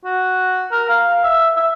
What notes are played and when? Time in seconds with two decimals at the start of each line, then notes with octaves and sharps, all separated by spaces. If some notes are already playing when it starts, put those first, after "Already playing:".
0.05 F#4
0.72 A#4
0.89 F5
1.24 E5
1.57 E5